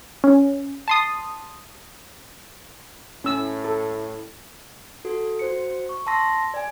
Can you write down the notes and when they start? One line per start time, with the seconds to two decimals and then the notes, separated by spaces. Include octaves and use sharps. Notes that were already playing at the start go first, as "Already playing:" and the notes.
0.24 C#4
0.88 A5 C6 D#6
3.24 A2 C#4 E6
3.64 A4
5.05 F#4 A4
5.39 F#4 C5 C#7
5.89 C#6
6.07 A5 C6 E6 A#6
6.54 D5 G#5